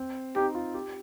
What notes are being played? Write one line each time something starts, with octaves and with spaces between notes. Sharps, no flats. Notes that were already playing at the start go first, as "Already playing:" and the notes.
Already playing: C4
D#4 G4
F4
G4